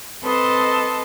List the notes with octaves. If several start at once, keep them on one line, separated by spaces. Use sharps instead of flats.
C4 A4 B4 D#5 A5 C6